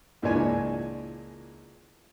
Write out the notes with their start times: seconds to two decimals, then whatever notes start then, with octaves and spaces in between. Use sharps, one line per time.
0.22 C#2 A#2 E3 D4 C#5 G#5